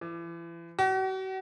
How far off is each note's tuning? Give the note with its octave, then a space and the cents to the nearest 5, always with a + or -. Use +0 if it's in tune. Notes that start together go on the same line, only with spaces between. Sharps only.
E3 +35
F#4 +40